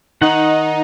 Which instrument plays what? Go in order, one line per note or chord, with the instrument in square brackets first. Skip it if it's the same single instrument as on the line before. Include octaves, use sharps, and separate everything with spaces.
[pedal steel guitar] D#3 F#5 [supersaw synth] D#4